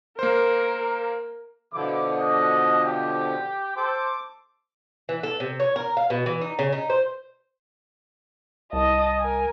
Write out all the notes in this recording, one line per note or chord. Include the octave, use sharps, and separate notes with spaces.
A#3 A#4 C5
B2 D3 F3 E4 D6
D4 D#5
G4
A4 C5 D6
E3
A4
C3
C#5
A#4
F5
B2
E3
D#4
C#3
D#4
C5
C2 D#5 A5
A#4 G#5